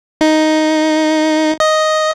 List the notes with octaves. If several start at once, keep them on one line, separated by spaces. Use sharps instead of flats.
D#4
D#5